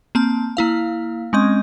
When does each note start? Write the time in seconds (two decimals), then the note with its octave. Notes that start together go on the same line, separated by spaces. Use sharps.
0.15 A#3 C4 A5
0.57 A#3 E4 F5
1.33 G#3 C4 C#4 D#5